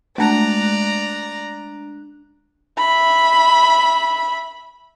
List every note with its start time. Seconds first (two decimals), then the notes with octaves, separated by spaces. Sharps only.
0.18 G#3 A3 D4 D5 A5 A#5 F#6
2.78 E5 B5